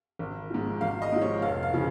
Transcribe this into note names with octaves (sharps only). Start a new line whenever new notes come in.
G#1
G#2 F3
G#1 F5
D#5
G#2 F3
C#5
F1 F5
F5
C#3 F3 C#4